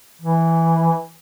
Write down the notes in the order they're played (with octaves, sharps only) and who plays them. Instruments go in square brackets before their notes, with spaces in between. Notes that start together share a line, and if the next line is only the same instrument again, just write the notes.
[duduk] E3